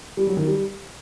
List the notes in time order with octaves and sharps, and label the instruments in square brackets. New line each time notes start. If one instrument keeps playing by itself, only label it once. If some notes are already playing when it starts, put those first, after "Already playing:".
[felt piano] G3
F#3
D#3
G3